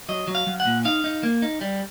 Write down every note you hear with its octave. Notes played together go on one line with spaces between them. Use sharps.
F#3 D#5
F#3
F5
F#3
F#5
A#2
D#4 F5
D#4
A#3
D#4
G3